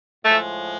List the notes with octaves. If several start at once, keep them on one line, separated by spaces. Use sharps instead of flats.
A2 F3 G#3 A3